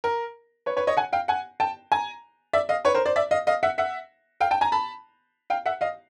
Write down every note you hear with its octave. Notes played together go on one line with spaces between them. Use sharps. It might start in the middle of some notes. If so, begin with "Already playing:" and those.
A#4
B4 C#5
B4 C#5
C#5 D#5
F#5 G#5
F5 G5
F#5 G#5
G5 A5
G#5 A#5
D5 E5
D#5 F5
B4 C#5
A#4 C5
C5 D5
D5 E5
D#5 F5
D#5 F5
E5 F#5
E5 F#5
F5 G5
G5 A5
G#5 A#5
A5 B5
F5 G5
E5 F#5
D#5 F5